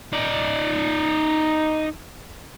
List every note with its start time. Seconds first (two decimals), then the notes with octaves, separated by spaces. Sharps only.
0.13 D#4 D5